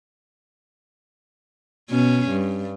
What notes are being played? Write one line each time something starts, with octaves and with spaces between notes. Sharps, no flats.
B2 C#4
G2